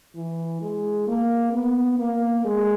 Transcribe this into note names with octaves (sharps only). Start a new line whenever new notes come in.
E3
G#3
A#3
B3
A#3
G#3